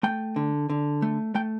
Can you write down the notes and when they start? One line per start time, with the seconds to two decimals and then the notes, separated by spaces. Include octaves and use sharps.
0.03 A3 G5
0.36 D3
0.70 D3
1.02 A3
1.35 A3 G5